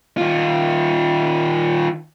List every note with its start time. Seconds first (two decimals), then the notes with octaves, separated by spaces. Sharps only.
0.18 D#3 F4